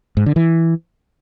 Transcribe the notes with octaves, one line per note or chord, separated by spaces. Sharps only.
G#2
D3
E3